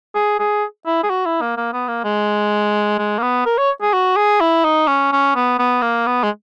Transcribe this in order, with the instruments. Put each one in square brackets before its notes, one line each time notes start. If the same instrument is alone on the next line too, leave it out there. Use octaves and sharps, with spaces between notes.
[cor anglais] G#4
G#4
E4
G#4
F#4
E4
A#3
A#3
B3
A#3
G#3
G#3
A#3
B3
A#4
C#5
G#4
F#4
G#4
E4
D#4
C#4
C#4
B3
B3
A#3
B3
G#3